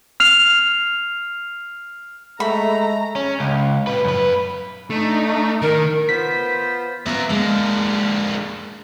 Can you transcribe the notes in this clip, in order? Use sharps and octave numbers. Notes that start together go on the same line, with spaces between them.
F6 C7 F7
G#3 A3 A#5 B5
C#4
C#2
A#2 B4
F#2 B4
A3 D4 D#4
D#3 A#4
B3 F4 C5 B6
B3 A#4 E5 F5
D3 G#3 A#3